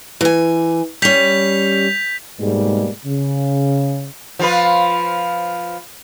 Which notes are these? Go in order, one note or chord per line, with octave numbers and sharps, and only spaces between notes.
E3 G#5
G3 C#4 G6 B6 F7
G#2 B2 G3 G#3 A#3
C#3
F3 F4 B4